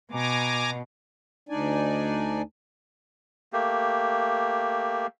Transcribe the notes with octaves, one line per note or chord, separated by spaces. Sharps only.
B2 G#5 A#5 D6
D2 D4 D#4 D5 G#5
A3 A#3 G4